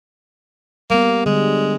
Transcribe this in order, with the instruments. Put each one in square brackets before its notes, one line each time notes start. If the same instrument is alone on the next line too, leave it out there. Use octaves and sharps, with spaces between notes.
[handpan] G3 B3 [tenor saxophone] A#3
[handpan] D3 G3 [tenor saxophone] G#3